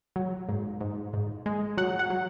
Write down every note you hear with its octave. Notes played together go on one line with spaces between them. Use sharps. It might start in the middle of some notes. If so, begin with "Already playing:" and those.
F#3
G#2
G#2
G#2
G#3
F#3 F#5
F#5
F#3